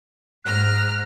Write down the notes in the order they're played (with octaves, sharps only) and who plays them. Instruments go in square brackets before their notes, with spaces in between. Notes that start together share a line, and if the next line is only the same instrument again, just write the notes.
[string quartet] G#2 A#5 F6 [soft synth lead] F#6